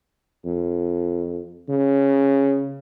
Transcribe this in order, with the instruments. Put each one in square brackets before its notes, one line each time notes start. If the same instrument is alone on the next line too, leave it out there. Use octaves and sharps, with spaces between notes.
[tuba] F2
C#3